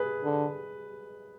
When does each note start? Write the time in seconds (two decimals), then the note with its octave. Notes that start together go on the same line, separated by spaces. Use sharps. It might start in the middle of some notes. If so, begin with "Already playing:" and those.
Already playing: G#4 B4
0.24 D3